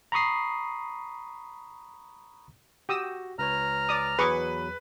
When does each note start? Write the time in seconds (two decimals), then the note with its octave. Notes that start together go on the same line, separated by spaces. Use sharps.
0.12 A#5 B5 C#6 D#6 C7
2.89 F#4 G4 D#6 E6 A#6
3.39 C#2 B4 C#5 A#5 F6
3.89 D5 D#6
4.19 E2 F#3 G#4 B4 C#6 D6